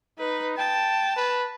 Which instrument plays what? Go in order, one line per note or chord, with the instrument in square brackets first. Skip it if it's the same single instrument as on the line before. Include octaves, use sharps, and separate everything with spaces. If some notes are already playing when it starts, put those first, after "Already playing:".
[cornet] D#4 [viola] B4
[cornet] G5 [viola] A5
[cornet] B4